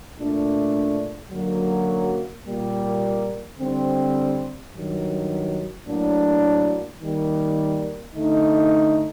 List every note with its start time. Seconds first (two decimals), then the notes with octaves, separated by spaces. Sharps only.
0.17 A#2 A3 D4
1.31 F#2 D3 F#3 A#3
2.44 A#2 G3 A#3
3.58 D3 G3 C4
4.72 G2 D#3 F#3
5.86 A2 F#3 A#3 D4
7.00 D#3 G3 A#3
8.14 D3 A3 D#4